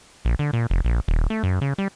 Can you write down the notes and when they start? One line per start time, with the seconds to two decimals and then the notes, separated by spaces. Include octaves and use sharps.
0.25 A#1
0.39 D3
0.53 A#2
0.70 F1
0.85 A#1
1.08 D#1
1.30 A3
1.43 F#2
1.61 C#3
1.78 G3